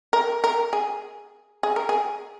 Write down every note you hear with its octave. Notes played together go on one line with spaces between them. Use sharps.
A#4
A#4
G#4
G#4
A#4
G#4